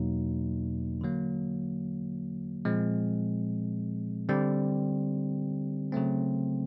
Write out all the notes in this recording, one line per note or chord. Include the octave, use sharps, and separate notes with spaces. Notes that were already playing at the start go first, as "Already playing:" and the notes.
Already playing: E2 B2 F#3 A#3 D#4
D3 F#3 A#3
A#2 F3 G#3 C4
D3 G3 C4
C#3 F#3 A3 C4